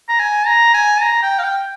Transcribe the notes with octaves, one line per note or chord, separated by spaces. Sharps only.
A#5
G#5
A#5
G#5
A#5
G5
F5
G5